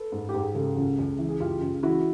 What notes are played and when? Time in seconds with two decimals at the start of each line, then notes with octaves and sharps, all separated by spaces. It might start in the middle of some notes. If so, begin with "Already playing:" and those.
Already playing: A4 B4
0.12 G#2
0.29 G4
0.34 G#2
0.42 G#4
0.55 C#3 G4 A4
0.77 C#2
0.98 C#2
1.19 E3
1.29 G#4
1.40 C#2 F4 G4
1.61 C#2
1.83 E3 E4 F#4